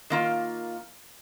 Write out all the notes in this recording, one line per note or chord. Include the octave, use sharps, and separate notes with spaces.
D#3 A#3 F4